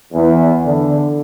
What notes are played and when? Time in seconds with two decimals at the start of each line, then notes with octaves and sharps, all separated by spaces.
0.13 E2
0.65 D3